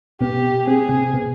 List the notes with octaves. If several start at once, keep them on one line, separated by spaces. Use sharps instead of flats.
B2 B3 G4
C4 G#4
C3 C4
B2 B3